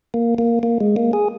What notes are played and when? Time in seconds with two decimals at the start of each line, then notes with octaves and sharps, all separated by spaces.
0.14 A#3
0.38 A#3
0.63 A#3
0.81 G#3
0.96 A#3
1.13 G#4